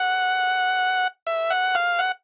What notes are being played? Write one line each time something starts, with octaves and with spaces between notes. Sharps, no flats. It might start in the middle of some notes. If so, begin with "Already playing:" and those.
Already playing: F#5
E5
F#5
F5
F#5